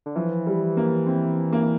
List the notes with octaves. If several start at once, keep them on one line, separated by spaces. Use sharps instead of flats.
D3
E3 F3
G3
A#3
C4
A#3